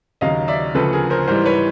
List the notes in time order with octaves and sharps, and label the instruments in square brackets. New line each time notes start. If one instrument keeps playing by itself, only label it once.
[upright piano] D#2 C#3 F#3 D#5 F5
D5 E5
D2 C#3 F3 A4 B4
G#4 A#4
A#4 C5
G#2 E3 G3 A#4 C5
B4 C#5